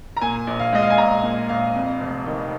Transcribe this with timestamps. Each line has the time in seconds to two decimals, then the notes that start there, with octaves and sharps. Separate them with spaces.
0.17 A#5
0.21 A#2 G#5
0.47 A#1
0.59 F5
0.73 G#3 D#5
0.82 F5
0.90 G#5
0.98 A#1 A#5
1.23 A#2
1.49 A#1 F5
1.75 F2
2.00 F1
2.26 D#3